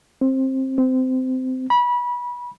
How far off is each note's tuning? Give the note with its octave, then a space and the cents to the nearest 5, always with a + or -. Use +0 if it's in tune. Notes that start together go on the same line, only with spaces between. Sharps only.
C4 +20
C4 -20
B5 -25